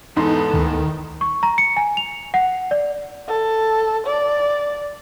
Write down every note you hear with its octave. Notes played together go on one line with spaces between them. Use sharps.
E2 G#2 B3 D#4 A4 C6
D2 D#3
C#6
A#5
C#7
G#5
F7
F#5
D5
A4
D5